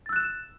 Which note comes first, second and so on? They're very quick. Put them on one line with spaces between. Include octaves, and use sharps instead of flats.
A6 E6 F#6 E7